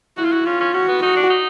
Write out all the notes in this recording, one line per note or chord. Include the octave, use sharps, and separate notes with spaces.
E4 F#4
F4
F#4
C#4 F4
C#4
C#4 F#4
B3
D#4 F#4
D4
D#4